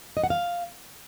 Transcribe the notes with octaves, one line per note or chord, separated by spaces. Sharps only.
D#5
F#5
F5